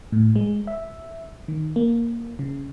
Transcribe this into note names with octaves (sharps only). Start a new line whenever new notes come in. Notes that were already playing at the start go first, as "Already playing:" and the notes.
A2
G#3
E5
D#3
A#3
C#3